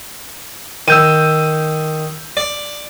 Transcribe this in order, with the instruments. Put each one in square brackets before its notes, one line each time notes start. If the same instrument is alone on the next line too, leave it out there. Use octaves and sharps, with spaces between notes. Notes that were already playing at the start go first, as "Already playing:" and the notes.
[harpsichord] D#3 [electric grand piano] E6 G6 D#7
[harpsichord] D5